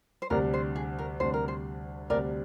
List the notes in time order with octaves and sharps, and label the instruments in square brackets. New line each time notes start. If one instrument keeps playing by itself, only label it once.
[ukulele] C5
[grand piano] D2 C3 G3 D4 [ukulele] A#4
[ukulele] C5
G#4
A#4
[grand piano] D2 C3 G3 D4 [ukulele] C5
[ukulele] A#4
C5
[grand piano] D2 C3 G3 D4 [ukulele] A#4 D5